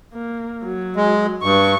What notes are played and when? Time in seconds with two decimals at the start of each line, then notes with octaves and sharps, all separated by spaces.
0.13 A#3
0.64 F#3
0.96 G#3
1.43 G2 C#6